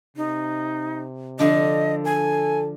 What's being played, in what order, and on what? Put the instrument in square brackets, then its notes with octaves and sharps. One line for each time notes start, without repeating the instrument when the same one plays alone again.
[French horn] C3 [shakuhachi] D#4
[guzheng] D3 F3 D4 [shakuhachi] D#5
[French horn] A4 [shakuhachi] G#5